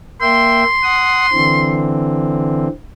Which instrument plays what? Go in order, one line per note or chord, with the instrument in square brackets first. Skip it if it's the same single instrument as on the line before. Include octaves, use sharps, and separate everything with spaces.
[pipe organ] A#3 E5 G5 [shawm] C6
[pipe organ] F#5 D#6
D3 E3 C4